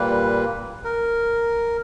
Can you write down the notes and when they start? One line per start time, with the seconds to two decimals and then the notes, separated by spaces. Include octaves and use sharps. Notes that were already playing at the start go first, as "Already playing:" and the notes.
Already playing: A#2 G3 A#3 B4
0.85 A#4